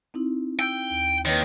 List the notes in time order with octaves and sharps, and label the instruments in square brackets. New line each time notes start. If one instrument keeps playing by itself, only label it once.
[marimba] C4 D#4 E4
[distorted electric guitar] G5 [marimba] E6 G6
[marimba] D#2
[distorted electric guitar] D#2 D#3 [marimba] B4 C#5